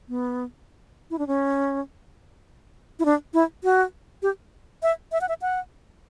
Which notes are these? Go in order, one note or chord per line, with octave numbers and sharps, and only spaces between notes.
B3
E4
D4
C#4
E4
D4
E4
F#4
G4
E5
E5
F#5
E5
F#5